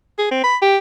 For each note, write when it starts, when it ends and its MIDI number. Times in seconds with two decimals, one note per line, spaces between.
0.18 0.26 68
0.31 0.40 60
0.44 0.57 83
0.62 0.77 67